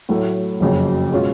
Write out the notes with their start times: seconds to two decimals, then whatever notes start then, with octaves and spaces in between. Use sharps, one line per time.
0.09 A2 F#3 A3
0.60 F#1 F2 C#3 F#3
1.12 B2 G#3 C#4 F4